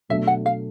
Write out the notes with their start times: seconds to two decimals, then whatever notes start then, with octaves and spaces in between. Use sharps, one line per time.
0.09 B2 F#3 A3 D4 E5
0.27 F#5
0.46 F5